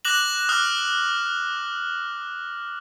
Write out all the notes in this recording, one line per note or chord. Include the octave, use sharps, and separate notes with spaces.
D6 F#6 A#6 E7 F#7
D6 D#6 F6 F#6